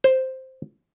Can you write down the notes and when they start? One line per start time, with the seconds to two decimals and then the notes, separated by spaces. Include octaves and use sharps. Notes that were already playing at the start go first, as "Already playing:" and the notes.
0.04 C5